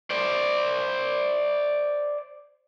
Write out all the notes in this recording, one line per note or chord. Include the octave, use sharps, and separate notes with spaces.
C5 D5